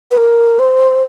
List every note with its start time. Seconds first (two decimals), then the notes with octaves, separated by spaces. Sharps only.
0.11 B4
0.17 A#4
0.59 C5